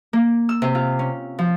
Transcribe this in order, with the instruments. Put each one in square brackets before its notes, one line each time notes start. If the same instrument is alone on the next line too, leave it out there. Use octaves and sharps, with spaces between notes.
[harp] A#3
E6
C3
F4
C#4
F3